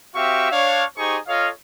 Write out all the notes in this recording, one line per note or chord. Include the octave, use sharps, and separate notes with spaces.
C4 F#4 G4 E5 F5 C#6
D4 C#5 F5
D#4 G4 G#4 C5 C#6
F4 A4 C#5 D#5 F5